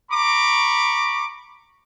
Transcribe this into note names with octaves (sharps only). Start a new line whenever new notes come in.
A#5 B5 C#6 D6